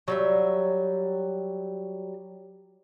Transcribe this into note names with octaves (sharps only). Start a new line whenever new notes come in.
F#3 G3 E5